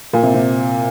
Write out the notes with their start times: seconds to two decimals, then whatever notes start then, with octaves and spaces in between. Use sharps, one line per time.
0.13 A#2
0.23 C3
0.34 C3